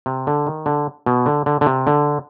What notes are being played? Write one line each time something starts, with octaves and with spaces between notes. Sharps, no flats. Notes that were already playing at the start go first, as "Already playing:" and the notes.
C3
D3
D#3
D3
B2
D3
D3
D3
C3
D3